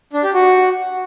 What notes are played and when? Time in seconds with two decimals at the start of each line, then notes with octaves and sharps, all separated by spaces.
0.13 D4
0.24 G4
0.34 F#4